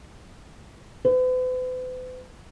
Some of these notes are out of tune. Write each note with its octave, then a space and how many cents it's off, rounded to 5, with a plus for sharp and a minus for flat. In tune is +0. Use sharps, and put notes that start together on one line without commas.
B4 +45